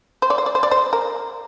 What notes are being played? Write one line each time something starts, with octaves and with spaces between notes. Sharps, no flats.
C5
D5
C5
D5
C5
D5
C5
A#4